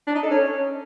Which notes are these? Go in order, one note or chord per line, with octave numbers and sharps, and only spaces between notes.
D4
D#4
A4
C#4